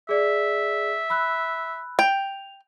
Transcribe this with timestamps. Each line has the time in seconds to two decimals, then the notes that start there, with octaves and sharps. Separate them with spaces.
0.09 G#4 D5 E5
1.10 B5 E6 F#6
1.99 G5 F7